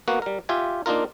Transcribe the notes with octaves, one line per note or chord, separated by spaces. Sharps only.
A#3 B3 F#4 F#5
G3 A#4
F4 G4 E5 G#5
A#3 D4 D#4 F4 A#4